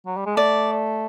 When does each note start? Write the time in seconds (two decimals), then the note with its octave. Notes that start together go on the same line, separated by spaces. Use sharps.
0.06 F#3
0.17 G3
0.26 G#3
0.36 A3 D5